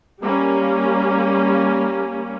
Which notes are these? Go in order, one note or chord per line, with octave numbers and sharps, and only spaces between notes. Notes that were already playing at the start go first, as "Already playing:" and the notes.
G3 A#3 C#4